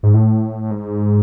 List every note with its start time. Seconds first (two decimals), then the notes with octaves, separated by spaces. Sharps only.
0.03 G#2
0.14 A2
0.70 G#2